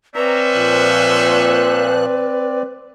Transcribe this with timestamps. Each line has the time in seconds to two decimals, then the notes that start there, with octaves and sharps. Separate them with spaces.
0.16 C4 C#4 B4 C5 D5 E5 A#5
0.54 A#2 F3 F#6